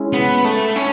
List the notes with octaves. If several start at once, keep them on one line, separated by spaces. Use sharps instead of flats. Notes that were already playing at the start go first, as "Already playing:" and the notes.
Already playing: G#3 C#4 E4
B3
A3
C#4